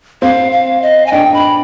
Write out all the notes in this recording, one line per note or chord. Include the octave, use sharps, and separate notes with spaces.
C4 F5
F5
D#5
G#5
D4 G5
B5